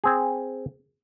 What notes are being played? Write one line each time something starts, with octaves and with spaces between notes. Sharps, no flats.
C4 G#4